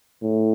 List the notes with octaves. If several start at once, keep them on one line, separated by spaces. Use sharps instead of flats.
A2